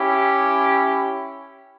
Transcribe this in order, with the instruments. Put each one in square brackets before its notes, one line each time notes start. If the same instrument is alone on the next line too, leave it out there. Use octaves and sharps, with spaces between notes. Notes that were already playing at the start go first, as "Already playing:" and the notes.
Already playing: [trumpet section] C#4 E4 G4